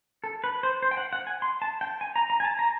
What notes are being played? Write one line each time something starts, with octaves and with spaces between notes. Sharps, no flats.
A4
B4
C5
C5
G5
F#5
F#5
G#5
C6
A5
G5
G#5
A#5
A#5
G#5
A5
A#5